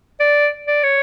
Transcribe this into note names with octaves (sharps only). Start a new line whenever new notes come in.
D5
D5
C#5